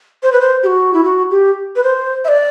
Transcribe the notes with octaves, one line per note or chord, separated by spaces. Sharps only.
C5
B4
C5
G4
F#4
E4
F#4
G4
B4
C5
E5
D5